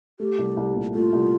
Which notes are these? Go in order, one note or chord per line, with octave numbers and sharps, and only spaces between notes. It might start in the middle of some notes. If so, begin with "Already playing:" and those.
A3 G4
C2
C2
A#2
A3 F4
C2